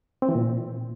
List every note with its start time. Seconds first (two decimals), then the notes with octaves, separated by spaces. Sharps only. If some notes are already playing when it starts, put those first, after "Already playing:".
0.22 C4
0.29 E3
0.35 A#2